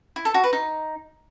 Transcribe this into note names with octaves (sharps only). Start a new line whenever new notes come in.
E4
A4
F#4
B4
D#4